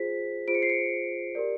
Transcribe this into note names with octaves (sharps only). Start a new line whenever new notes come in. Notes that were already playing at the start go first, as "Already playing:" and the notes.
Already playing: F4 G#4 C5 B6
F4 G#4 C5 D7
C#7
C7
C#7
G4 A#4 D5